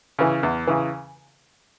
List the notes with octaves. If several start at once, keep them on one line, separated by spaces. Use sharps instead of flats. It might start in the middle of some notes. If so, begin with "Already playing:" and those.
C#3 E3
E2
C#3 E3